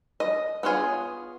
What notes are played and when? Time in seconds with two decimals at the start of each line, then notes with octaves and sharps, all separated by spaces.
0.20 D#5
0.63 B3 D4 F4 G#4 C#5